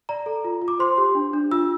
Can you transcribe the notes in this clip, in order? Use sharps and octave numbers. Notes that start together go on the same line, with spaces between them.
D5 A#5
A4
F4
F4
D6
C5 C6
G4
D4
D4
F4 E6